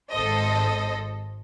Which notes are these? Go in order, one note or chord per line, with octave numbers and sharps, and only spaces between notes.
G#1 A4 C5 D#5